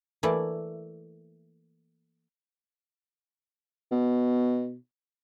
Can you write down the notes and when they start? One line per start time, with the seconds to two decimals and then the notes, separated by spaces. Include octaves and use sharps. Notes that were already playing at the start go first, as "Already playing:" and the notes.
0.23 E3 A3 A#3 E4 D5
3.92 B2